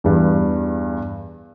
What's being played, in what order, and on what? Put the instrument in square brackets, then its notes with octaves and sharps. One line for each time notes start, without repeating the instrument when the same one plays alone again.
[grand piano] E2 G2